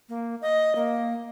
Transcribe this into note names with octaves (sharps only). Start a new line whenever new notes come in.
A#3
D#5
A#3